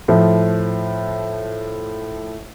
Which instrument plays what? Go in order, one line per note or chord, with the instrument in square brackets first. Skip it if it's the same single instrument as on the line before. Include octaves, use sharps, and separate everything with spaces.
[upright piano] A2 F3